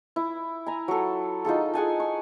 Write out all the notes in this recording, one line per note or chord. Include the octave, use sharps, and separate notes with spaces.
E4
G#5 A#5
F#3 A4
D#4 F4 G#4 A4
G#4 F#5 G#5 A5
C#6